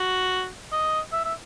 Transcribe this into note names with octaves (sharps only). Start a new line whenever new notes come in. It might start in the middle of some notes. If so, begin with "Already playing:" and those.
Already playing: F#4
D#5
E5
E5